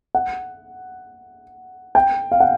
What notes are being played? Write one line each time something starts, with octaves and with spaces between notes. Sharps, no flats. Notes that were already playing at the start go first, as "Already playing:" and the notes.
F#5
G5
F5
F#5